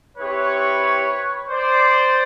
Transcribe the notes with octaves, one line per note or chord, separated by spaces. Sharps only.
C4 E4 G4 B4 C#5
C5 D5